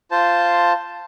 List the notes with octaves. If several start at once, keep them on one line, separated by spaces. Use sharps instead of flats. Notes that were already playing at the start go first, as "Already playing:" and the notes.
F4 C5 A5